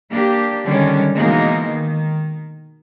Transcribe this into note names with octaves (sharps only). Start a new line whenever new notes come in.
A#3 D4 G4
D3 D#3 G3 G#3 C#4 D4
B2 E3 G#3 A#3 D#4
D#3